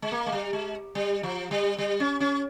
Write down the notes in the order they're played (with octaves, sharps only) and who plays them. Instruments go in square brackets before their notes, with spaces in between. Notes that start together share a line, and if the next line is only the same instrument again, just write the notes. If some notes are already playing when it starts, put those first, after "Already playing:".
[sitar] G#3
A#3
G#3
G3
G#3
G3
F3
G3
G3
C#4
C#4